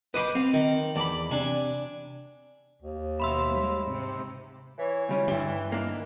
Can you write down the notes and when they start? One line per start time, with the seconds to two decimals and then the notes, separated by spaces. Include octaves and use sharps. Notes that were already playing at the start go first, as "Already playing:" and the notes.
0.14 B4 D#5 G5 B5 D6 D#6
0.35 C4 F5
0.54 D#3
0.96 E2 D5 B5
1.31 C3 D4 G#5
2.82 D#2
3.20 B2 D#3 E5 B5 C6 E6
3.53 G3 G#3
3.84 G#2 C3
4.78 E3 C#5
5.09 C#2 G3 C#4
5.28 G2 D3 G3 E4 G5
5.72 A#3 D4 D#4